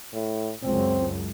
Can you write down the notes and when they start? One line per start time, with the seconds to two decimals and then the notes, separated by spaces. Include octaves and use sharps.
0.13 A2
0.63 C#2 F#2 C4